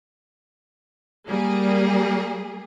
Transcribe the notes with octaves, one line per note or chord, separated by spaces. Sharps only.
G3 A#3 G#4